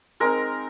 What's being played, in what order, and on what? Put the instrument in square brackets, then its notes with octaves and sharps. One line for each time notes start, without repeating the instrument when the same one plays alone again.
[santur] G#3 C4 D#4 A#4